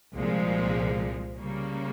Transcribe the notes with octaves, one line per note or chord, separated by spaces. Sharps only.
C2 A#2 F3 G#3
C#3 G3 A#3